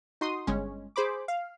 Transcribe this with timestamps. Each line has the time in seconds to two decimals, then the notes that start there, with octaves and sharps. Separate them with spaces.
0.21 D#4 F#4 C6 D#6
0.47 G1 G#3 C#4
0.96 G#4 C5 B5 D6
1.28 F5